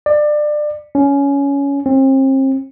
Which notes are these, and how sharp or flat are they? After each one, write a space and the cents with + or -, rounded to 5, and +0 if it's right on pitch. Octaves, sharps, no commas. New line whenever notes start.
D5 +25
C#4 +15
C4 +40